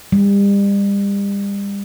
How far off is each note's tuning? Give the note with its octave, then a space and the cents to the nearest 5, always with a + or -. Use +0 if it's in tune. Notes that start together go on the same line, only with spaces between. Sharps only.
G3 +35